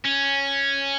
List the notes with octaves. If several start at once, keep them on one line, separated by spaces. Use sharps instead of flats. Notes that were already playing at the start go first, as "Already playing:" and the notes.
C#4